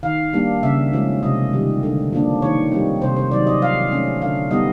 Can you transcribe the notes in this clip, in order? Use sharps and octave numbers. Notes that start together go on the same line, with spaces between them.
D#3 F5
G3 A#3 D4
C#3 E5
F3 G#3 C#4
C3 D#5
D#3 G3
D3
F3 A#3 D4
D#3 C#5
G3 C4 D#4
C3 C5
C5
D#3 F#3 D5
D#5
F3 F5
A3 C#4
D3 F5
G3 B3 D#4 D#5